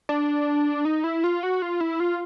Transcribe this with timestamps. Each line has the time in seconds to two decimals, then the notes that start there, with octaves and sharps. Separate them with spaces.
0.09 D4
0.85 D#4
1.04 E4
1.24 F4
1.43 F#4
1.62 F4
1.81 E4
2.00 F4